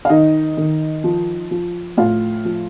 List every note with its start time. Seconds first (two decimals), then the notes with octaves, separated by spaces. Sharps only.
0.05 F5
0.09 D#3 D#4 D#5
0.57 D#3
1.04 F3
1.51 F3
1.97 A2 F4 F5
2.45 F3